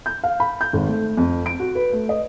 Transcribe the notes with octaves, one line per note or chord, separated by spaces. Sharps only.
G6
F5
B5
G6
G#1
A3
F2
D7
F#4
B4
A3
D#5